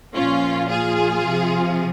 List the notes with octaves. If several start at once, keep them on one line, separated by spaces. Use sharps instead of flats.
A#2 F3 C#4 F4
F4 G#4
C3 F3